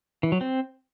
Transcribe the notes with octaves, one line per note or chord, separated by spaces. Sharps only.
E3
F#3
C4